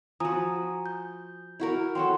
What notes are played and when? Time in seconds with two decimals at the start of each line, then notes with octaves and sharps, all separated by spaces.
0.20 F3 F#4 G#5 A#5 D#6
0.86 G6
1.60 E4 F#4 A#4
1.95 F#3 F#4 A4 F#5 G5 C6